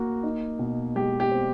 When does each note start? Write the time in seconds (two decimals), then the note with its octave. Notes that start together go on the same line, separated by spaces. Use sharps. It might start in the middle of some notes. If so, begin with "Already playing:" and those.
Already playing: A#3 F#4
0.23 D#4
0.59 B2
0.95 G#3 G4
1.20 G4
1.31 C4